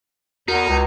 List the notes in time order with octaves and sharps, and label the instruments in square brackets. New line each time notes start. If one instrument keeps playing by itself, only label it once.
[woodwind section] E2 A#4 [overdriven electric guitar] D#4 [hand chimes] F#4
[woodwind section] C#2 [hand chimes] A#5